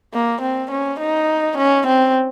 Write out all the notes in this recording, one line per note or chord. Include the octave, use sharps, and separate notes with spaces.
A#3
C4
C#4
D#4
C#4
C4